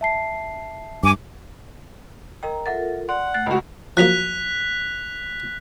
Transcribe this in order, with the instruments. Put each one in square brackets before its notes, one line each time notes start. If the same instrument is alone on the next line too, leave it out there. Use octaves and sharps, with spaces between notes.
[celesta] E5 A5 C7
[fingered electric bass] G2 [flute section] G#5 D6
[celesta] A#4 D#5 G5 [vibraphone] A#5
[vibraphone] F4 A4 A#4 [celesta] E5 F#5 A6
[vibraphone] D5 [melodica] F#5 [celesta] C6
[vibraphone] A3 [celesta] F#6 A6
[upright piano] C#2 F#4 [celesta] B5
[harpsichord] F3 F#3 A#3 [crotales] F#6 B6 F7